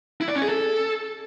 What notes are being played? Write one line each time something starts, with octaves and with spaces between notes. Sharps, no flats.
E4
D5
C#4
G#4
A4